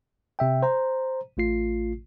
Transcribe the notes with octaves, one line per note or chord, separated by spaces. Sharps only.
C3 E5 G5
C5 A#5
A1 A3 F4 C7